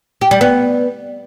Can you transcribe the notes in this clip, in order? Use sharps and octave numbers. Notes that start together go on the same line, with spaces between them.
G4
G3
B3